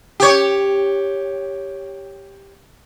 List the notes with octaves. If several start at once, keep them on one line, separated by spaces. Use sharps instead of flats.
G4 C#5